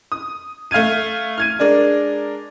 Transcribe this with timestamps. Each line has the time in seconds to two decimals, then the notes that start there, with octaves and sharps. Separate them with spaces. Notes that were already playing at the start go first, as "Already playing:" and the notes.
0.12 D#6
0.71 A3 F5 F6 G#6 D#7
1.38 F6 G#6 D#7
1.59 G#3 D4 A#4 D5